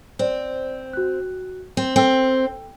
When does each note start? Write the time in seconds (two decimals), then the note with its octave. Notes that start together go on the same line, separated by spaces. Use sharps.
0.19 C4 C5 D5
0.93 F#4 F#6
1.77 C4
1.96 C4 A4 G5 E6